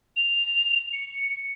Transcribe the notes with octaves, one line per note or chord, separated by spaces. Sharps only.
F7
C#7